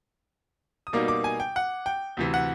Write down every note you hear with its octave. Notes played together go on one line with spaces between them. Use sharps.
D#6
B2 G3 A#3 D#4 D6
D6
G#5
G5
F#5
G5
D2 C3 E3
F#5